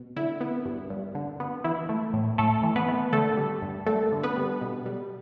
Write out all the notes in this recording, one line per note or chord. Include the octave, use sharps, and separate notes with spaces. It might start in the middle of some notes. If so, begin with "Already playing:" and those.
Already playing: B2
D3 E4
B3
G2
G2
D3
B3
E3 E4
A3
A2
A2 A3 A4
E3
B3 B4
A3
D3 A3 A4
G3
G2
G2 A3 A4
D3
B3 B4
G3
B2
G3